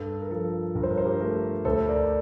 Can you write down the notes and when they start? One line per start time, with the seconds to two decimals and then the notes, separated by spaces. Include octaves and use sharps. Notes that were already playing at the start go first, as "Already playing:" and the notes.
Already playing: G2 A4
0.22 A#4
0.31 F3 A4
0.75 G2 A#4
0.83 C5
0.90 A#4
0.98 C5
1.05 G4 A#4
1.21 A3 G4 A#4
1.65 D2 A4 C5
1.88 A#4 D5